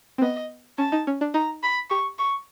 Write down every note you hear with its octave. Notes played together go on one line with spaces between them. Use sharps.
C4
B3 D#5
C#4 A5
D#4
C#4
D4
D#4 A#5
B5
G4 C#6
C#6